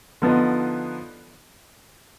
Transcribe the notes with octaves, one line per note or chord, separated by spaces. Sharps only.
D3 F3 B3 D#4